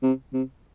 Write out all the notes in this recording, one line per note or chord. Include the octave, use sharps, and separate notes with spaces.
C3
C3